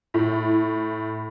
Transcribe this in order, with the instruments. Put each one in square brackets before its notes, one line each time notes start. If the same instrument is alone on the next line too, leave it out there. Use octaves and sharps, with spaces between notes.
[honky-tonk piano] A2